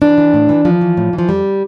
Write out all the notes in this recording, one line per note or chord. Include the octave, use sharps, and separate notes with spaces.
E3 D4
E3
A2
E3
E3 F3
E3
A2
E3
F3
F2 G3